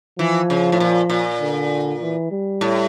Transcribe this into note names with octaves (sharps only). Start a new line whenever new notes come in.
E3 F3
C#3
A2
A#2
A#2
D3
E3
G3
A2